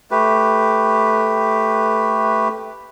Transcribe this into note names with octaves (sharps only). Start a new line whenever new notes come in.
A3 G4 B4